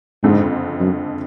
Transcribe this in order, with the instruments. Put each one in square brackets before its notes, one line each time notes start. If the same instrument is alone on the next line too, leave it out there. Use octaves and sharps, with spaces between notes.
[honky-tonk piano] F#1 F2 D3 G#3 [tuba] G#2
[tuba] F#2